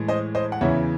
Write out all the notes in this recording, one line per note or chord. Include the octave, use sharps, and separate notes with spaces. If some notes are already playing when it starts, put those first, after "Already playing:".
Already playing: A2 E3 G#3
C5 D#5
C5 D#5
F#5
E2 C#3 E3 C#5 E5